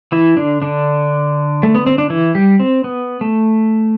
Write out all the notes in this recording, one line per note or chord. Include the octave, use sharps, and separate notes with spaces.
E3 E4
D3 D4
D3 D4
A3
B3
C4
D4
E3 E4
G3 G4
C4
B3
A3